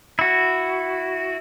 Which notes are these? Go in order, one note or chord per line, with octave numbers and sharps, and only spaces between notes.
E4 F#4